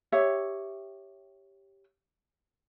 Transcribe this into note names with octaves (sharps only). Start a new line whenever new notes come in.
G4 C#5 E5